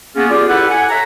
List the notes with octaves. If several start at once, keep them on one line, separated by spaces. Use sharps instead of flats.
A#3 B3 C#4 F4 F#4 G#4
F4 G4 G#4 D5
E4 G4 A4 B4 F#5
F#5 G#5
A4 C#5 E5 F#5 A#5